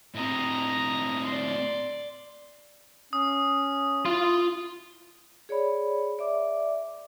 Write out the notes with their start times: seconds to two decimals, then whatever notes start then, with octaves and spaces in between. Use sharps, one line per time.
0.15 A2 C4 D#5 A#5
1.25 D5 C6
3.13 C#4 D#6
4.05 E4 F4 C6
5.49 G#4 C#5 D5 B5
6.19 D5 E5 D6